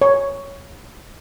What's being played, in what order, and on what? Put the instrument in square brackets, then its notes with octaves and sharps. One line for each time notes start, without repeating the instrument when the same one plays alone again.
[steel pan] C#5